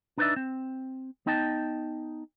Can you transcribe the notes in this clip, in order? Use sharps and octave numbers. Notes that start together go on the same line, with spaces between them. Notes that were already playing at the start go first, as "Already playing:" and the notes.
D4 D#4 B4 C5 D5 E5
C4
B3 D#4 D#5 G5 A5